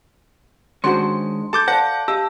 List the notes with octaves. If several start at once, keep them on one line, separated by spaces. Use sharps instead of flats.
D#3 G#3 C#4 D4 F#4 C5 C6
A4 A5 D6 G6
C5 D5 F5 F#5 A5
G4 D#5 F5 A5 E6